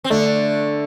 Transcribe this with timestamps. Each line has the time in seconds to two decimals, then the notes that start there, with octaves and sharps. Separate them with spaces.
0.04 C4
0.10 D3 A3 D4